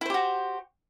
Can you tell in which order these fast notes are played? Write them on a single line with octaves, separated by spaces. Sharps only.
E4 C5 G4 F#4